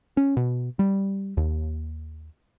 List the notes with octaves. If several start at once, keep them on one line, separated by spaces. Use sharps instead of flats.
C#4
B2
G3
D#2